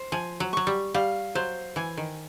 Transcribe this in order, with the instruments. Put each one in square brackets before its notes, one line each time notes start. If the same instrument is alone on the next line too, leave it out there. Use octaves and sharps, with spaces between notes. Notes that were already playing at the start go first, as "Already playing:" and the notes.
Already playing: [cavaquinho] C5
[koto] F3 [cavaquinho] G#5
[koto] F#3
[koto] F#3 [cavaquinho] C#6
[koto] G3
[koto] G3 [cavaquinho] F5
[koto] F#3 [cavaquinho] C5
[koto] E3 [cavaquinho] G#5
[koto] D#3